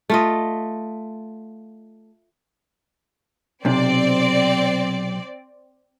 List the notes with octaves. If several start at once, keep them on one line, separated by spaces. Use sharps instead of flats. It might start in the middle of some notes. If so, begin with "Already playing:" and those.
A3 F4 D#5
B1 C3 C4 D5